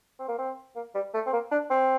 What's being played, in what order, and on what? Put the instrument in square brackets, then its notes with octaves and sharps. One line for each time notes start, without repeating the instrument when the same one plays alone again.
[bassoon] C4
A#3
C4
A#3
G3
A3
C4
A#3
D4
C4